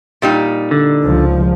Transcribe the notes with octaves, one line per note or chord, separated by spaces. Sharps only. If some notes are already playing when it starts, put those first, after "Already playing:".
A#2 G3 D#4
D3
C#2 F3